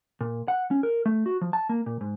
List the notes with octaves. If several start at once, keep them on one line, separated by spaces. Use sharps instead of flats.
A#2
F#5
C#4
A#4
A3
F#4
F3
A5
A#3
A#2
G#2